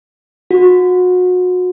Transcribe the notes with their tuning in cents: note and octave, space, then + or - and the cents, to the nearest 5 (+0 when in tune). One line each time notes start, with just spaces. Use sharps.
F#4 -30